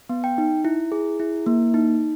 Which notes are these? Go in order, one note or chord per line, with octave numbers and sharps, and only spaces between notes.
B3
G5
D#4
E4
G#4
E4
A#3
D#4